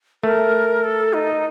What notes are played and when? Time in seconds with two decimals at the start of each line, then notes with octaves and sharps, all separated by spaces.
0.23 A3 A#4
0.84 A4
1.13 D#4